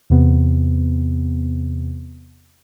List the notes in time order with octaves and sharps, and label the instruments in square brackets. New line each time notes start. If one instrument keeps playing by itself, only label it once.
[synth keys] E2 C3 B3